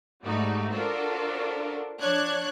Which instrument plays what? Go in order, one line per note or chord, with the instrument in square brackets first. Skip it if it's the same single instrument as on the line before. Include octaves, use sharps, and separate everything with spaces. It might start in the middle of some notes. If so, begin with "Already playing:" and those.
[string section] G#2 G3 A3 D#4 F#4
D4 F4 F#4 A4 A#4 C5
F3 D4 C#5 F#6 G#6